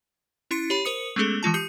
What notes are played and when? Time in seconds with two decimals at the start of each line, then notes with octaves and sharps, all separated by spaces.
0.51 C#4 E4 C6 A6 C#7
0.70 G4 C#5 B5
0.85 A#4 C5 D#6 C#7
1.16 G#3 A3 B3 C#4 G#4 A4
1.43 E3 G#3 F4 A5
1.54 G4 D#6 G6 C#7